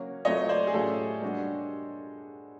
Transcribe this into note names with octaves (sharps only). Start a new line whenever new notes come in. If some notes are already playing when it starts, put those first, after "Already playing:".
Already playing: F#3 A#3 C#4 F#4
F#3 A3 C4 F4 C#5 D#5
C5 D5
G#4
A2 F#3 A3 C#4 F4 G4 A4
G3 A#3 D4 F#4